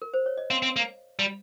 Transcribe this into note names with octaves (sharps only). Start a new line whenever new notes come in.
A#4
C5
C#5
D#5
C4 F5
C4
A#3
G3